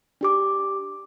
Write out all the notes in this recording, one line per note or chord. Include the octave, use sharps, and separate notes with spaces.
D4 G4 D6